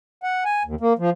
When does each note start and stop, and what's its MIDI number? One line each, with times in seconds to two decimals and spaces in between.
0.23 0.44 78
0.45 0.63 80
0.65 0.75 39
0.81 0.93 58
0.99 1.10 53